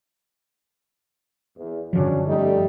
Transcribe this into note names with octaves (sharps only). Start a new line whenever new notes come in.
E2
G2 D3 F3 F#3 C#4 D4
G3 A3 D#4